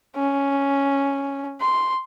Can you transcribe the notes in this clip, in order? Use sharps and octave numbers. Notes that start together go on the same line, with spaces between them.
C#4
C6